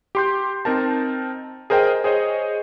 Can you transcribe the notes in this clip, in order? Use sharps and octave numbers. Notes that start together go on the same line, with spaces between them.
G4 C6 G6
C4 D#4 A#4 A5
G#4 A#4 C5 D#5 G5
G#4 C5 C#5 D#5